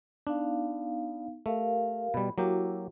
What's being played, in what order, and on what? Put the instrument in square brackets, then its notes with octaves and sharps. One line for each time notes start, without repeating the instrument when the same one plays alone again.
[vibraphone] B3 D#4 F5 [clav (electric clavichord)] D4
[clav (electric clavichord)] A3 [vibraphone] G4 A#4 F5
[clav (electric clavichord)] B2 G3 [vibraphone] B5
[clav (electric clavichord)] F#3 A#3 G4 [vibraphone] E4 F#4